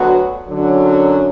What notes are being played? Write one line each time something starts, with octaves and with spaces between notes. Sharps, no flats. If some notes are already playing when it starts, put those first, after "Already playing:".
Already playing: D2 D3 F#3 B3 F#4
F#2 D3 F#3